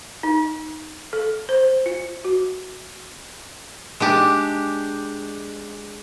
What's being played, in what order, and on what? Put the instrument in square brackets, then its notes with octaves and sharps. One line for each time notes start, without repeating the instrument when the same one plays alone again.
[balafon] D#4
A4
C5
F4
F#4
[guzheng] G#3 D4 G4